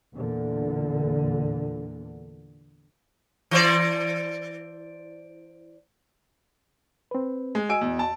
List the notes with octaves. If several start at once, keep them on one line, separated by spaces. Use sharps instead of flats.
E2 A#2 D3
E3 C5 D5
C4 B4
G#3
F#4 D#5 G#5 E6 D7
E2
A5